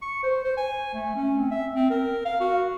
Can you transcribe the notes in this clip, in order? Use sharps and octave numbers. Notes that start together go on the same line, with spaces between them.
C#6
C5
C5
G#5
A3
C#4
C4
E5
C4
A#4
F5
F#4